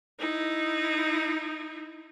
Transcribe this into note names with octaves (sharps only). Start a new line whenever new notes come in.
D#4 E4